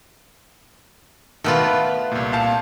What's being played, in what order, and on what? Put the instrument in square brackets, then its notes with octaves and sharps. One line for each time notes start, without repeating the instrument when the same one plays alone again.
[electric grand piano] B2 D#3 [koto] A3 B3 F4
[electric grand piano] B4
C2 A#2
A#2 F5 A5